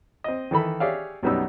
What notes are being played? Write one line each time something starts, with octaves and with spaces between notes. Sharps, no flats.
C4 D#5
D#3 E3 A4 B5
G4 G#4 C#5 D5 E5 F5
B1 F#2 G3 B3 D#4 E6